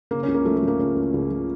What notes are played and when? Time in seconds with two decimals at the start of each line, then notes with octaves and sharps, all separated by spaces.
0.11 C#3 A#3
0.23 C#4
0.28 C#2
0.34 A#3
0.45 F3 A3
0.57 A3
0.62 F3
0.68 A#3
0.79 C#2 C#4
0.96 C#2
1.14 C#2
1.30 F3